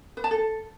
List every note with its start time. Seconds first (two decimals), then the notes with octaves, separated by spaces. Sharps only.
0.17 B4
0.24 A5
0.31 A4